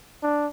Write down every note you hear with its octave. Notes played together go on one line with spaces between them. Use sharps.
D4